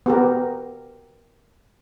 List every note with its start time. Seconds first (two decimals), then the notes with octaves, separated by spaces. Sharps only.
0.06 B3 G4 A#4